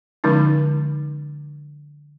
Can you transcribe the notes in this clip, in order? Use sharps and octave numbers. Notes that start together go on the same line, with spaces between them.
D3 F3 G#3 C#4 D#4